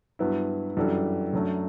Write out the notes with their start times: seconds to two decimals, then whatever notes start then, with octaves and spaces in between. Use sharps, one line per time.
0.19 G2 F#3 B3 E4
0.77 F#2 E3 G3 D4 A4
1.33 F#2 F#3 A3 D4